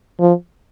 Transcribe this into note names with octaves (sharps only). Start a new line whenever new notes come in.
F3